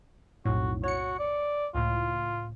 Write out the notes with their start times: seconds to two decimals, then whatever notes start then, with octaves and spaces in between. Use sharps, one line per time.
0.45 B1 F2 A2 F#4
0.84 F#4 C#5 C#7
1.19 D5
1.75 C#2 A2 F4